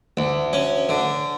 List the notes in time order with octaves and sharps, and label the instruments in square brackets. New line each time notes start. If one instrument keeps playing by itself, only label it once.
[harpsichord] D2
C#4
D3